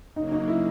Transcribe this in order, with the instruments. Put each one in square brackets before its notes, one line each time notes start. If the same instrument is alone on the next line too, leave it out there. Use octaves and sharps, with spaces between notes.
[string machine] C#3 F#3 A#3 [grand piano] D#4
[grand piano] D#4
E4